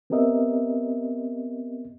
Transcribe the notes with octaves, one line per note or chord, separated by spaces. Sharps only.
B3 C4 G4 A#4 D#5 E5